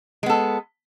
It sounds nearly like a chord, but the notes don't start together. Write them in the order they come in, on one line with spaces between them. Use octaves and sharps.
G#3 B3 A4